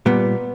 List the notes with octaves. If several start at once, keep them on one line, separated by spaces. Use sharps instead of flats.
A#2 G3 B3